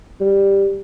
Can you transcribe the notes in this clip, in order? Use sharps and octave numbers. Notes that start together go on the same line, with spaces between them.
G3